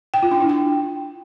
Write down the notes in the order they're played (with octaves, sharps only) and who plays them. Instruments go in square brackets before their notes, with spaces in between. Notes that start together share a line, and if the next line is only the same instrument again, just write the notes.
[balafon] G5
F4
D4
E4
G5